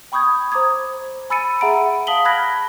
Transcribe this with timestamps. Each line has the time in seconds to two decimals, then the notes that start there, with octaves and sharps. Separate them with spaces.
0.12 G5 B5 C#6 D#6 G6 G#6
0.52 C5 A#5 D6 D#6 G#6
1.30 G#5 B5 E6 A6 C#7 D#7
1.61 G#4 E5 F#5 A#5 B5 D7
2.07 F5 A5 D#6 B6 F#7 G7
2.25 B5 F6 F#6 G#6 A#6 B6